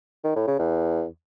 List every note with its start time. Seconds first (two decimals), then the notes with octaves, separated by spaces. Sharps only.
0.24 D#3
0.36 A2
0.47 C#3
0.59 E2